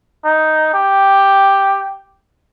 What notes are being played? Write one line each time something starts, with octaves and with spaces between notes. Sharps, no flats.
D#4
G4